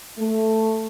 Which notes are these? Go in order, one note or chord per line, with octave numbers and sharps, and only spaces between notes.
A3